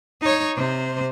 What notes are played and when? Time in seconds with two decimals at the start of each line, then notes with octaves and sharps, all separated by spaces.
0.21 D#4 C#5
0.56 C3 C5